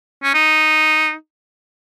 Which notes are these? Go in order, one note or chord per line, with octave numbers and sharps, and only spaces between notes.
C#4
D#4